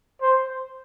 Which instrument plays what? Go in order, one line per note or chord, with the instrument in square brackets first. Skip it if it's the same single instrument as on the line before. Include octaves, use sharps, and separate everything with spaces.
[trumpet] C5